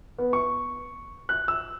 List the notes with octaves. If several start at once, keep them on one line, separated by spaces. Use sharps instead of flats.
B3
C#6
F#6
E6